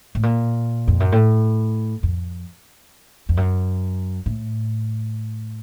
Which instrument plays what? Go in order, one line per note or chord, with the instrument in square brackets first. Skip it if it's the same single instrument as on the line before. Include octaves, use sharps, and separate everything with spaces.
[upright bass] A2
A#2
F2
F#2
A2
F2
F2
F#2
A2